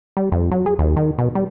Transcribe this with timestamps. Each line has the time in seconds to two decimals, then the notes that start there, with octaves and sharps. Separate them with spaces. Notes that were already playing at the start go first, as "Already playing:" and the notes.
0.17 G3
0.32 F2
0.51 F#3
0.66 G#4
0.79 D#2
0.96 D#3
1.18 B2
1.35 G3